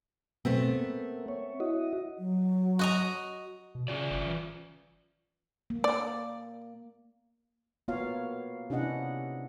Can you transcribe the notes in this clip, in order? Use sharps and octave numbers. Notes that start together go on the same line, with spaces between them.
B2 A3 B3 C4
A#3
C#5
E4 F#4 D#5
F#3
F#4 D#5 A#5
B2
C#3 C#4 F4 D5
G1
E3
A#3
D5
A#3 B3 F4 F#4 C#5 F5
C3 C#4 D4 E4 D#5 F#5